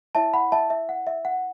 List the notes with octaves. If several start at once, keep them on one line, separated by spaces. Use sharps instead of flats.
E4 C#5 E5 A5
F#5 B5
E5 A5
E5
F#5
E5
F#5